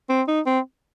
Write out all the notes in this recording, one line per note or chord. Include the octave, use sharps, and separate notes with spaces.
C4
D#4
C4